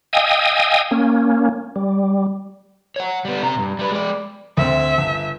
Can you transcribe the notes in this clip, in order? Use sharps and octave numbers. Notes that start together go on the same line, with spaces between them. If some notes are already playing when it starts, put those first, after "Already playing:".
D#5 F5 G5 G#5 D#6 E6
A#3 C#4
G3
C#5 F#5
G3 B3
C3 A#5
G2
G3 B4
G#3 D5
D2 C4 E5
G1